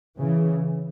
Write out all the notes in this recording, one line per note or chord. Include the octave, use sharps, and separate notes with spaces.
C#3 E3